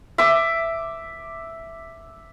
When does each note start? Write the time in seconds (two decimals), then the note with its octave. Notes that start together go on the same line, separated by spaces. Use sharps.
0.18 E5 D6